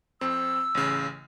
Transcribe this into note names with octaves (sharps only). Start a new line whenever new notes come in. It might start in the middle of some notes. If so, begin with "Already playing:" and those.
F2 C4 E6
A1 C#3